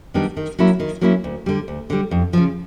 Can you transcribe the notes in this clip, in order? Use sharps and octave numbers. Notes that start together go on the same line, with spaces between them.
D#3 G3 B3 D4
D#3
F#3 A#3 C#4 E4
D#3
F#3 A#3 C#4 E4
D2
D3 G3
D2
D3 G3
F2
C#3 F3